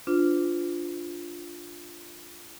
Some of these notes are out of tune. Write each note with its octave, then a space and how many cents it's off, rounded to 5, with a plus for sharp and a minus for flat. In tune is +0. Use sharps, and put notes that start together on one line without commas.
D4 +0 F4 +0 C5 -45